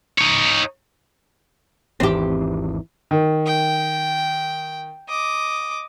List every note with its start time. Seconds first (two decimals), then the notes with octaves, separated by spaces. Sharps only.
0.18 D#4 C#5
2.00 G#1 E2 E3 C4 G4
3.11 D#3
3.46 G5
5.08 D#5 D6